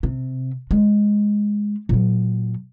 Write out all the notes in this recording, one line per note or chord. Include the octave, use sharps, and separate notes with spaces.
C3
G#3
A#2 F#3